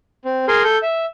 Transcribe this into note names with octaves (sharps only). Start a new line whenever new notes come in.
C4
G#4 A#4 G#5 C6
A4 G6
E5